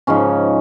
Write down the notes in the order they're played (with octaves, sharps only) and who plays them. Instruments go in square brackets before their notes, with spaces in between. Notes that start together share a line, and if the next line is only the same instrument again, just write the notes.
[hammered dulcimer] G#2 C#3 F3 C#4